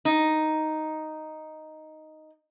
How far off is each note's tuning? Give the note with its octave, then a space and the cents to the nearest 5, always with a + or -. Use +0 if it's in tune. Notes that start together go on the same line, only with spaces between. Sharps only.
D#4 +0